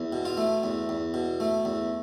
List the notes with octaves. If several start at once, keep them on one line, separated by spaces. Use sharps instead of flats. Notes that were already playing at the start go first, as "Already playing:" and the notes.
Already playing: E2
B2
F4
A3
E2
E2
B2
A3
E2